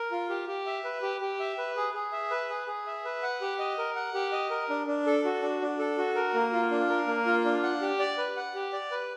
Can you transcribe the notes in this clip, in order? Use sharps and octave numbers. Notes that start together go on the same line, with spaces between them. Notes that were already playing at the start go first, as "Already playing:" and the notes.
Already playing: A#4
F4
G4
G4
E5
B4
G4
G4
E5
B4
G#4
G#4
E5
B4
G#4
G#4
E5
B4
F#5
G4
D#5
A#4
F#5
G4
D#5
A#4
D4
D4
A4
F#4
D4
D4
A4
F#4
A#4
A#3
F4
D4
A#4
A#3
F4
D4
F#5
G4
D5
B4
F#5
G4
D5
B4